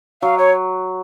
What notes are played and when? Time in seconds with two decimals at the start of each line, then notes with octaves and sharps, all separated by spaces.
0.22 F#3 F5
0.38 C#5